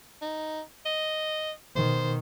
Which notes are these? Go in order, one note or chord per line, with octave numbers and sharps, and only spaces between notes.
D#4
D#5
B2 D#3 C5